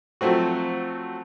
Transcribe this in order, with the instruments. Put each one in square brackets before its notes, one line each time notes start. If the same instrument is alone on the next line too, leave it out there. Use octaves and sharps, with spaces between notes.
[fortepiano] F3 F#3 A3 C4 F#4